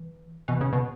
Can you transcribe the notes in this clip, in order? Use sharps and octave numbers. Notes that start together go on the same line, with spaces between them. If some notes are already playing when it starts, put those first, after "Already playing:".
Already playing: E3
B2 E3
C#3
B2